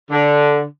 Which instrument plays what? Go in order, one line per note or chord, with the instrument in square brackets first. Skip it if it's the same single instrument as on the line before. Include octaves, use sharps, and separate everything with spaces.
[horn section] D3